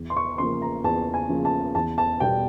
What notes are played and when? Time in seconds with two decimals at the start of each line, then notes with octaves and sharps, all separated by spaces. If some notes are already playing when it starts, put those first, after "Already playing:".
Already playing: E2
0.10 C6
0.16 C#6
0.38 C#3 F3 A#3 C6
0.62 A#5
0.84 E2 A5
1.14 G#5
1.29 C#3 F3 A#3
1.45 A5
1.75 E2 A5
1.98 A5
2.20 B2 G3 B3 G5